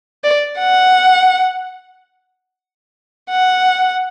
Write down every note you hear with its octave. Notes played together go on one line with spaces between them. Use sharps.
D5
F#5
F#5